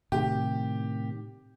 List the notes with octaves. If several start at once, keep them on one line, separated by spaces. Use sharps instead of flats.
A2 C3 D#3 G4